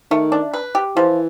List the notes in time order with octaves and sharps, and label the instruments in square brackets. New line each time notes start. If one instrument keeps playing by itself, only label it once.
[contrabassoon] D#3 [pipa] A3
[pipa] D4
B4
G4
[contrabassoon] E3 [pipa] F3